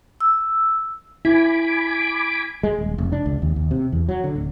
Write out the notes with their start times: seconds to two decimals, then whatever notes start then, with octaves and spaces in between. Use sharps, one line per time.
0.20 E6
1.25 E4 G#5 B5 D6
2.63 G#3
2.78 D#1
2.98 F1
3.12 D4
3.26 C#2
3.42 D#2
3.56 D#2
3.71 C3
3.92 E2
4.09 F#3
4.24 D3
4.35 D1